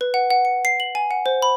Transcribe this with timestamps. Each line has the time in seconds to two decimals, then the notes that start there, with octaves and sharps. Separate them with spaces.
0.01 B4
0.14 F#5
0.30 F#5
0.45 C#7
0.65 C7
0.80 F#7
0.95 G#5
1.11 F#5
1.26 C5
1.42 B5